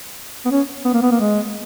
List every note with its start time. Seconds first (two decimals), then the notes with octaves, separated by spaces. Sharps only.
0.45 B3
0.51 C#4
0.85 B3
0.93 A#3
1.02 B3
1.11 A#3
1.20 G#3